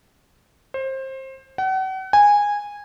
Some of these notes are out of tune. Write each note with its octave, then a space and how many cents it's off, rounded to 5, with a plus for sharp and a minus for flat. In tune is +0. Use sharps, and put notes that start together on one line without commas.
C5 +25
F#5 +40
G#5 -15